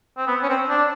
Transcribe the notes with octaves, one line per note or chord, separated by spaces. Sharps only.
C4
B3
C#4
C4
D4